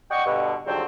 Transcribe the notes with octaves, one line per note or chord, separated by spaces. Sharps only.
D5 D#5 F#5 G5 C#6
G2 B2 D3
F2 G#2 D3 F#3 G3 C4